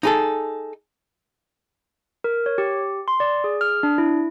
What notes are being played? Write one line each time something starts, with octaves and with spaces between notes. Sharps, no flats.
D#4 G#4 A4
A#4
C#5
G4
C6
D5
G#4
F6
D4
E4